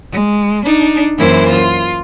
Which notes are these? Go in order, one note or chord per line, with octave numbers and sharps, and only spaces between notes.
G#3
D4 D#4
F#2 E3 A#3 E4 C5
F4